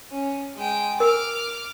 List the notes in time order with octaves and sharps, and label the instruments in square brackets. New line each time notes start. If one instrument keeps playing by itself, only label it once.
[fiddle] C#4
G#3 G5
[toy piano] A#4 [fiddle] D6 F6